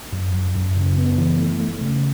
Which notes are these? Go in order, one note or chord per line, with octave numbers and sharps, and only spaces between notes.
F#2
F#2
F#2
C#3
B3
E3
A3
A3
C#3